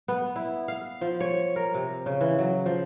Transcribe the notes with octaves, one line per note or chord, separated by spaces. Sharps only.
B3
E4
F5
F3
C#5
A#4
C3
C#3
E3
F#3
F3